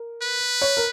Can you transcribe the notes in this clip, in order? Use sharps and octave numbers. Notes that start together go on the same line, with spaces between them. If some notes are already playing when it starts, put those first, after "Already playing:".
Already playing: A#4
B4
C#5
A#4